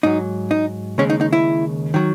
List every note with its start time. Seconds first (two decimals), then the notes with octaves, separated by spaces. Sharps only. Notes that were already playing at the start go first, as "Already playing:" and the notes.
0.03 G#2 F#3 D#4
0.51 D#4
0.98 D#2 C#3 G#3 C#4
1.10 D#4
1.21 D#4
1.33 E4
1.94 D#3 F#3